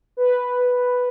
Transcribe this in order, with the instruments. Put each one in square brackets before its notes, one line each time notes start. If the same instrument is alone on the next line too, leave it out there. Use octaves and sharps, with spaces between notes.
[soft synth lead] B4